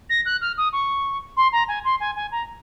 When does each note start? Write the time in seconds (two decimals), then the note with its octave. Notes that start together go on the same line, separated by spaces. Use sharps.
0.09 A#6
0.25 F#6
0.41 F6
0.57 D#6
0.73 C#6
1.37 C6
1.52 A#5
1.68 G#5
1.84 C6
2.00 G#5
2.16 G#5
2.31 A#5